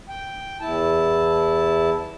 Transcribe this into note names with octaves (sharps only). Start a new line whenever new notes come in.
G5
E2 E4 A5